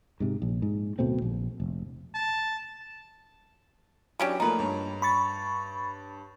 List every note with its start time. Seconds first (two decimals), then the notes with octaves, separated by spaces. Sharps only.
0.20 G#2 C3
0.42 A#1
0.62 G#2
0.99 D1 B2 A3 C4
1.22 A#1
1.60 F1
2.15 A5
4.20 E3 F#3 C#4 D4 G4
4.40 F3 A3 A#3 D#4 B4
4.59 G2 C#5
5.02 B5 C#6 A6